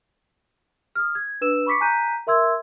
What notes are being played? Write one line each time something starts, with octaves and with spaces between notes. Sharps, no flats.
D#6 F6
G#6
D4 B4 E6 E7
B5 C#6 D6 B6 C#7
G#5 A#5 F#6 G6 B6 D#7
A#4 E5 C6 E6 G#6